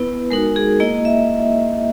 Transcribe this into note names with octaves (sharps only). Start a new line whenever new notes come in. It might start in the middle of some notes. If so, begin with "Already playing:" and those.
Already playing: B3 E4 B4
G#3 D#4 F#4 A#4
G#4
A#3 E4 D#5
E5